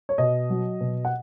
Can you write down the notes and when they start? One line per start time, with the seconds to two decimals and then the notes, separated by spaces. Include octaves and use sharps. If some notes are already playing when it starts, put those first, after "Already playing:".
0.09 C#5
0.18 B2 D#5
0.50 F#3
0.81 B2
1.05 F#5